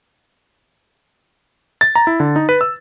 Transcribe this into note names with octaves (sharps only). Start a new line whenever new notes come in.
A6
A#5
E4
D3
D#4
B4
E6